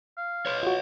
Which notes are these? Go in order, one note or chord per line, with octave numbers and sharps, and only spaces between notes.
F5
B4 C#5
F4 F#4